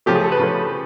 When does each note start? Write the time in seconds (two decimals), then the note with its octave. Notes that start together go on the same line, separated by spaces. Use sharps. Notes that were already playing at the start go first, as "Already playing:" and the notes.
0.06 C#3 F3 A3 G4
0.15 G#4
0.23 A4
0.32 B4
0.39 C#3 F3 A3